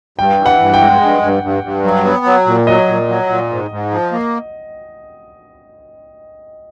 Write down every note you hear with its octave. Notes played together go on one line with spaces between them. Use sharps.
G2 G5
E3
F#5
G2
G5
G#3
G2
G2
G2
G2
F#3
B3
F#3
A#2
F#3 D#5
A#2
F#3
A#2
G#2
G#2
F3
A#3